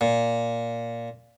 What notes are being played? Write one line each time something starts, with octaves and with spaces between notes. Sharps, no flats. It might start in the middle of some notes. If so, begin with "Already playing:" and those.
A#2